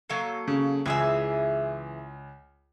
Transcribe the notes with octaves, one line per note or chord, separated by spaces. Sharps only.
F#3 A#3 A4
C#3
C#2 E3 G#4 E5